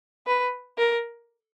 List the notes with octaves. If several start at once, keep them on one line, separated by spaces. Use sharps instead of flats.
B4
A#4